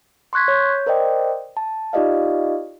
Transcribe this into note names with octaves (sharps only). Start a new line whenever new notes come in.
C6 C#6 F#6 G#6 B6
C#5 G6
A#4 C5 D5 D#5 G5
A5
D#4 F4 G4 D5 D#5 F5